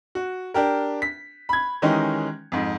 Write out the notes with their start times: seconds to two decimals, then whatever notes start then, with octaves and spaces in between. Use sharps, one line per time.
0.15 F#4
0.54 D4 G4 A#4
1.02 B6
1.49 B5 G#6
1.82 D#3 E3 G#3 C#4 D#4 G4
2.52 F2 G#2